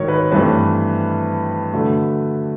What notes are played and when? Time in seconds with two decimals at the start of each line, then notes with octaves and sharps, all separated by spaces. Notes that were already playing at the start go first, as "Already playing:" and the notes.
Already playing: G#2 D#3 F#3 C#5
0.08 B4
0.31 G2 E3 A3 C4 B4
1.73 D3 F#3 A3